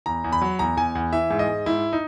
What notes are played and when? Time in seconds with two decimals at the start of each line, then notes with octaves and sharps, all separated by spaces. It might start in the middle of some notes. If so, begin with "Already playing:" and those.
0.06 E2 A#5
0.24 E2
0.33 B5
0.42 F#3
0.59 E2 A#5
0.77 E2 G#5
0.95 E2
1.13 E3 E5
1.30 G#2
1.39 D#5
1.48 G#2
1.66 G#2 E4
1.93 D#4